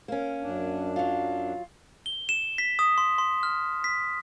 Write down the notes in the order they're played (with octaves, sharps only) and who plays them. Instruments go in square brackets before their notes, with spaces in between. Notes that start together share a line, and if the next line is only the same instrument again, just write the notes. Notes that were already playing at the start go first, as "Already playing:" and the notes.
[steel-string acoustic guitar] A#3 C#4
[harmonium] F#2 D4
[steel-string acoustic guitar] F#3 F4
[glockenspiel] G7
E7
B6
D#6
C6
C6
F6
B6